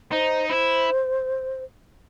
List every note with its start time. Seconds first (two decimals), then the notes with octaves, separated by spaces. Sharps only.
0.12 D#4 C5
0.50 E4 C5